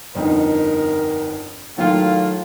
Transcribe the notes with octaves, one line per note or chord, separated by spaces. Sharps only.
G1 F2 D#4 A#4
A2 D#3 F#3 F4 F5 G5